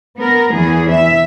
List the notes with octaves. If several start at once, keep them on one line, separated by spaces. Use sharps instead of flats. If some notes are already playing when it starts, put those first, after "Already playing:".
B3 A#4
E2 E3 G#4
E5